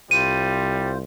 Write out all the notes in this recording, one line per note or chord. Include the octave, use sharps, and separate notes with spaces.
C2 G3 F4 C5 D#7